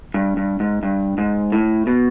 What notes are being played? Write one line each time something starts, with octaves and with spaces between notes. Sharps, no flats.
G2
G2
G#2
G2
G#2
A2
B2